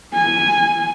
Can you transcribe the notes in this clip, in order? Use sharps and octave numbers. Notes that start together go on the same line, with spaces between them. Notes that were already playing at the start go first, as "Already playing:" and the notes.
G#5